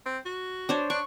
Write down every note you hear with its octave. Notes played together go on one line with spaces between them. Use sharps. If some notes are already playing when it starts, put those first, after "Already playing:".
C4
F#4
D4 C5 C#5
D4 C#6